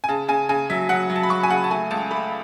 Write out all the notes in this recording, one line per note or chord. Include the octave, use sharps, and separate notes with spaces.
G#5
C#3 A5
C#3 G#5
C#3 G#5
F#3 E5
F#3 F#5
F#3
A5
B5
F#3 C#6
G#5
C#3 F#5
A5
A3 G#5
C#2 A5
A3 B5